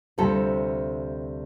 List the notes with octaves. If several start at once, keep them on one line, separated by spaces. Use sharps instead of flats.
D2 C3 G3 C4 F4 A4